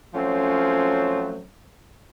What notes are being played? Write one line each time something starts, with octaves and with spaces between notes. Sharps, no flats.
F3 F#3 A3 C4 C#4